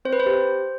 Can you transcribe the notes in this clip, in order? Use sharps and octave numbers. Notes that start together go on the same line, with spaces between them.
C4 C5
B4
C5
G4